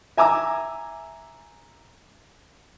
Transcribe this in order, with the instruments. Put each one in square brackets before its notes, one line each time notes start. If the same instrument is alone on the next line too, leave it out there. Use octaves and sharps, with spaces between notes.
[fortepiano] E5 G#5 A#5 D6 E6